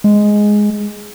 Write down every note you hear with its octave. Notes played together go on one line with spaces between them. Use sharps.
G#3